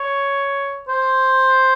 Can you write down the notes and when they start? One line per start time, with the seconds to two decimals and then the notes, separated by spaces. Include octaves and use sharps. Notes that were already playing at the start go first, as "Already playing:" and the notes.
Already playing: C#5
0.88 C5